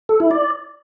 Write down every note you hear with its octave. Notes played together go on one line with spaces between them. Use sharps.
A4
E4
D5